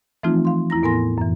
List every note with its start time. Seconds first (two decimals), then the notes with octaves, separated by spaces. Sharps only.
0.23 E3 F3 A3 C4 D#4 F4
0.45 F5 C6
0.70 E2 E4 A#5 A#6
0.83 A2 B3 A#4 G#5 C6 A#6
1.18 F#2 E3